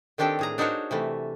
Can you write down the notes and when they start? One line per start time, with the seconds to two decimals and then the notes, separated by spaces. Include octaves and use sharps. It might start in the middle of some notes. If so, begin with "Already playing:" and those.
0.18 D#3 C4 D4 G4 A4 G5
0.39 A2 G#4 A#5
0.58 D4 D#4 F#4 A#4 C5 C#5
0.91 C3 E3 A3